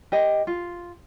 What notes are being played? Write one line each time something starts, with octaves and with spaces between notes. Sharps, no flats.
G4 D#5
F4